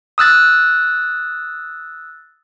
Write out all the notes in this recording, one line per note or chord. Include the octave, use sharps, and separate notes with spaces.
D#6 E6 F#6 A6